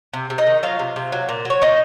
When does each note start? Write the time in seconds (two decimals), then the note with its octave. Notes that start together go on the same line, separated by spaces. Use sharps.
0.13 C3
0.30 C3
0.38 D#4 D#5
0.47 D#3
0.63 F#3 F4 F5
0.79 C3
0.96 C3
1.12 F#3
1.29 A#2
1.45 F#3 C#5
1.62 A#2 D#4 D#5